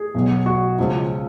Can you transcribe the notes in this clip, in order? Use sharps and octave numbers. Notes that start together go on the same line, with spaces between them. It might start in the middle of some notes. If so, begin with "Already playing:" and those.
Already playing: G#4
B1 B2 F#3
F#4
C#2 C#3 F3